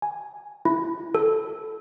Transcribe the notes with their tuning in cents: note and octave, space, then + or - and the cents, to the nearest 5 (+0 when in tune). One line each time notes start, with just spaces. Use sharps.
G#5 +0
E4 +5
A4 -15